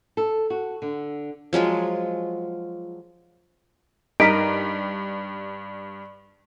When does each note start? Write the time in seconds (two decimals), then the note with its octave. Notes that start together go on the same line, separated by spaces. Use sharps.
0.17 A4
0.50 F#4
0.82 D3
1.53 F3 F#3 G#3 F4
4.20 G2 D#4 A#4 D#5 B6 D7